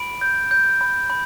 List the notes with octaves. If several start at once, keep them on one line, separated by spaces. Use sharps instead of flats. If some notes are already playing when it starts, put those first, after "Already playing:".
Already playing: B5 D7
G6
G6
B5
B5